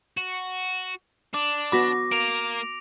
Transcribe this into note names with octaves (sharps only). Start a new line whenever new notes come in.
F#4
D4 D6
B3 F#4 B5 D6 A#6
A#3 A#4 D7 F7